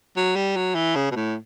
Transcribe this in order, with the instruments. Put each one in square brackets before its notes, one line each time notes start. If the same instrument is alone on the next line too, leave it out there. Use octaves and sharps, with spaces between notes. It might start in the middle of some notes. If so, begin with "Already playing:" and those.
[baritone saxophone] F#3
G3
F#3
E3
C#3
B2
A2